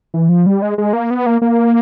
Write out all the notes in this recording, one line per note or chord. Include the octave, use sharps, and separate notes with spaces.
E3
F3
G3
G#3
G#3
A#3
B3
A#3
A#3